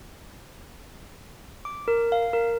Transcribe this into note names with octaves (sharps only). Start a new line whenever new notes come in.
D6
A#4
F5
A#4